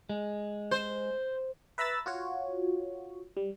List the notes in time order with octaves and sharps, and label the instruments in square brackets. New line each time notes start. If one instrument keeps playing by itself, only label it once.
[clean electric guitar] G#3
[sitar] C5
[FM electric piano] B4 E5 A#5 B5 E6 A6
F4 F#4 C#5
G3